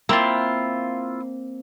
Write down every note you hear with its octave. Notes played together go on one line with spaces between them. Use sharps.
A#3 C4 E4 F4